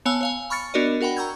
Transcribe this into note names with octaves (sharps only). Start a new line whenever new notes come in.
B3 C#5 F5 G#5 A5 E6
C#5 F5 G#5
B5 C#6 F6 A6 C#7
B3 D4 F#4 A#4 D5 D#5
F#4 A#4 F#5 G5 B5
A#5 C#6 E6 G6 G#6